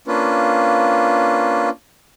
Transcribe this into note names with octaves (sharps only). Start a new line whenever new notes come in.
A#3 C#4 D4 F4 B4